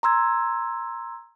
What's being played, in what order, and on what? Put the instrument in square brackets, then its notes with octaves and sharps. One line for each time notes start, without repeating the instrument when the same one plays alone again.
[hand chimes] A#5 C6 E6 G#6